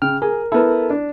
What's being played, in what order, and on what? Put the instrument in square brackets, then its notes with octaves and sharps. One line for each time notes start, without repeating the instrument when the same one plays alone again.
[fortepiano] C#3 [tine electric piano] G5 F6
[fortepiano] G#4 [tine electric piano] A#4
[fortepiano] B3 E4 [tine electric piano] A4 A#4
[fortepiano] D4